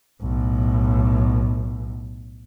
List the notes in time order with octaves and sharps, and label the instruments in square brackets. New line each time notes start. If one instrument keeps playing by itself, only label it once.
[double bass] B1 A2